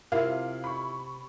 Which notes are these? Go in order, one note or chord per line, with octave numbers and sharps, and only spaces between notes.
C3 E4 F4 A#4 E5 F5
B5 C#6